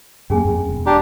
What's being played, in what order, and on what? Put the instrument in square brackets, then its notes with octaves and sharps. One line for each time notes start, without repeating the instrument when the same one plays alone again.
[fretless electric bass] F#2 A#3 [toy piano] C#4 G#4 G#5
[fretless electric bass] F2
E1
[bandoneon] D4 G4 [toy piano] A#5